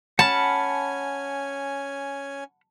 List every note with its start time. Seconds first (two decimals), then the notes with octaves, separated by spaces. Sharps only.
0.19 C#4 F#5 G#5 A5 B5 F6